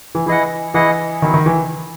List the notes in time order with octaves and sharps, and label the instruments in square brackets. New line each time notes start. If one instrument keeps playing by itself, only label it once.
[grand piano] E3
[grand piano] E3 [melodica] E4 G#4 D#5 F#5
[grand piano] E3 [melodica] E4 G#4 D#5 F#5
[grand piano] D#3 [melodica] F#3 B3 E4
[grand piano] D#3
E3